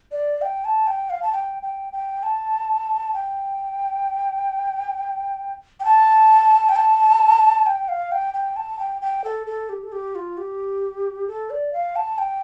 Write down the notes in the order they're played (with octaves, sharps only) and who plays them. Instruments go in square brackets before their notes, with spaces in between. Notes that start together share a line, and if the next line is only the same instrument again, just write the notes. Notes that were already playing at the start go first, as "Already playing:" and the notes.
[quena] D5
G5
A5
G5
F5
A5
G5
G5
G5
A5
G5
G5
A5
G5
A5
G5
F5
G5
G5
A5
G5
G5
A4
A4
G4
A4
G4
F4
G4
A4
D5
F5
A5
G5